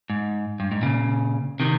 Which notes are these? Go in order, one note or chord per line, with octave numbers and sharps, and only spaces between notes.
G#2
G2
G#2
A#2 C#3
C3 D#3